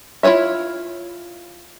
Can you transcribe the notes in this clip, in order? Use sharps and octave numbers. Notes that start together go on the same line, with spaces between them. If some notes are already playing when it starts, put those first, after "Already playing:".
E4 F4 C5 C#5 E5